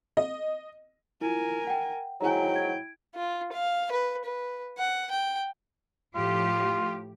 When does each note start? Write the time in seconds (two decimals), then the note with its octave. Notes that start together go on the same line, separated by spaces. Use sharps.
0.17 D#5
1.21 E4 F4 A#4 G#5
1.67 F#5 G5
2.21 G#2 F#3 E4 G5 G#5 A#5
2.56 G#6 D7
3.15 F4
3.52 F5
3.91 B4
4.24 B4
4.78 F#5
5.11 G5
6.15 A2 F3 F4 G4